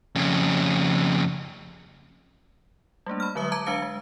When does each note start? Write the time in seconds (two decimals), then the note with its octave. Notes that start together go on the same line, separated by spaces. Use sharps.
0.15 F2 C#3
3.06 G3 A3 A#3 D4
3.20 B5 F6
3.35 D3 F#3 G#3 B4 E5 D#6
3.52 A5 A#5 D6 G#6
3.66 G#3 D4 B4 F5 C#7
3.82 G#3